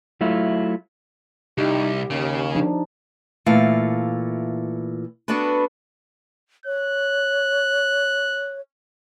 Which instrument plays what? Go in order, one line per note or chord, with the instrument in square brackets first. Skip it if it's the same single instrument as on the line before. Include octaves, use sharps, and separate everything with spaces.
[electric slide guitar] F#3 A3 E4 F4
[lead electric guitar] C2 [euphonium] D#4 [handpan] G4
[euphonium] D#2 [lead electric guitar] C#3
[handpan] F3 D4 D#4
[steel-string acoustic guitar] A#2 E3 A3 F5
B3 D4 F#4 A4 B4
[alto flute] C#5 [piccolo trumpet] F#6